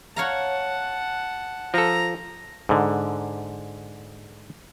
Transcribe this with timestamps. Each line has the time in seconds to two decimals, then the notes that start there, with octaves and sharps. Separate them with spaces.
0.16 C#5 F5 F#5 A5 A#5
1.74 F3 A4 A#5
2.69 G#2 D3